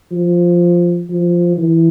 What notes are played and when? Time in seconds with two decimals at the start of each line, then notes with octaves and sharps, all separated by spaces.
0.12 F3
1.10 F3
1.57 E3